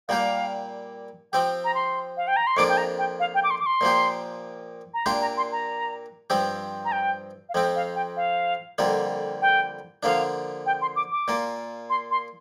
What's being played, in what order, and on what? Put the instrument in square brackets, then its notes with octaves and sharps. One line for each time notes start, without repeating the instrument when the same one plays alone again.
[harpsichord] A#2 G3 A#3 G4 [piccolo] F5
[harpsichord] F3 C4 G4 [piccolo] G5
[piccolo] A#5
C6
F5
G5
A#5
C6
[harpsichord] F2 F3 A#3 D4 F4 [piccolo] D6
[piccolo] G5
A#5
G5
F5
G5
D6
C6
D6
C6
[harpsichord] A#2 F3 A#3 G4
[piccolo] A#5
[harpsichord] A#2 A#3 D4 G4 [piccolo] C6
[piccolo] A#5
C6
A#5
[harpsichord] G2 F3 C4 G4
[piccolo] A#5
G5
F5
[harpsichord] F2 F3 C4 [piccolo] G5
[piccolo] F5
G5
F5
[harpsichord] F2 D3 G3 A#3 F4
[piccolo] G5
[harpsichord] D3 F3 A#3 D4 [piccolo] F5
[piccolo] G5
C6
D6
D6
[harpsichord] A#2 A#3 F4
[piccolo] C6
C6